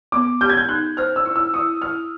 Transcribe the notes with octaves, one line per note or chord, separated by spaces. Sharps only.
B3 D6
G4 G6
G#6
G6
D#4 F#6
C5 F6
E6
E4
E6
E4 D#6
E4 F6